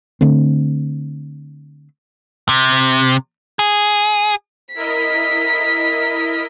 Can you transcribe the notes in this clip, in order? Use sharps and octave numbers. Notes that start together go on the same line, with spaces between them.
D3 A3 C4
C3
G#4
E4 A#4 D#5 B6